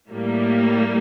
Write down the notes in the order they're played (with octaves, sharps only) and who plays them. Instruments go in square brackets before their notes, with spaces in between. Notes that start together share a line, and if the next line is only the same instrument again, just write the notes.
[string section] A2 G3 A#3